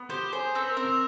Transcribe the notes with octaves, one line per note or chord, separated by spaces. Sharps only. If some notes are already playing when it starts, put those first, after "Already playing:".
Already playing: B3
G4 C5
G#4 C5
C4 A4
B4
A#4
C4
A#4